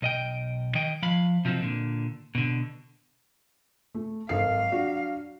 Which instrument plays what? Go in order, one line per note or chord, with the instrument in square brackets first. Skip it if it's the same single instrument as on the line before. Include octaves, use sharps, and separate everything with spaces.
[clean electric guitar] B1 D#5 G5
D#3 D#5 G5
F3 F5 B5
C3 F3 F#3 G#3 C4 D#4
A#2 D3
B2 D3
[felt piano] A3
[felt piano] G#1 A4 C7 [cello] F#3 F5
[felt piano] D4 F#4